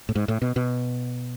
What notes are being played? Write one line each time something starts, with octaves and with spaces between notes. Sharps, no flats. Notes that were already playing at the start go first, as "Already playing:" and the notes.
A2
G#2
A2
B2
B2